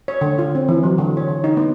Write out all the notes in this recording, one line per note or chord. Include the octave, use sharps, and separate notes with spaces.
C#5
D3
F4
C4
E3
F#3
D3
C#5
D3
D#4
B3